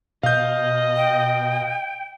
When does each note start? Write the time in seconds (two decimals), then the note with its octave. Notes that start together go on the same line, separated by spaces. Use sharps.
0.23 B2 D#5 F5 G6
0.96 G5